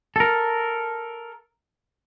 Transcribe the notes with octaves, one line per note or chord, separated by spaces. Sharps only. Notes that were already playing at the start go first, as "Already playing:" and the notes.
A4 A#4